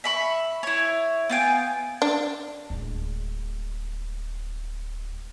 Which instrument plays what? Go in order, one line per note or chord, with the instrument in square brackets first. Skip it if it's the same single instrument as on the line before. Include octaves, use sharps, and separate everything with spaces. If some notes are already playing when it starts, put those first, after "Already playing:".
[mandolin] E5 B5 C#6
E4 C#5
B3 F4 G5 G#5
[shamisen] D4
[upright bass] D1 G#3